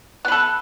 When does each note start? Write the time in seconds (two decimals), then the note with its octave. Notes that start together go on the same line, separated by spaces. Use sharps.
0.25 B3
0.28 B4
0.32 A4